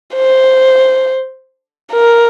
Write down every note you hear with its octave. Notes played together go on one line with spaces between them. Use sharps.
C5
A#4